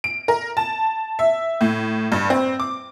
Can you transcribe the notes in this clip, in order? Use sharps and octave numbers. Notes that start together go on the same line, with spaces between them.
D7
A#4
A5
E5
A2
G2
C4
D6